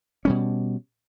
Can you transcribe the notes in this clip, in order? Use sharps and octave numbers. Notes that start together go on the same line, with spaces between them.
B2 G3 C#4